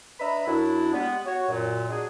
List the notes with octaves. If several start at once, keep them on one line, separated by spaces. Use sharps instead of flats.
D4 B4 D#5 E5 A#5 B5
F#2 F#3 D4 E4
G3 G#3 B3
F#4 C#5
F#2 A#2
F#3 D4 D#4 F#4 G#4